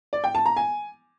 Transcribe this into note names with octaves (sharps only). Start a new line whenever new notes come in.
D5
G5
A5
A#5
G#5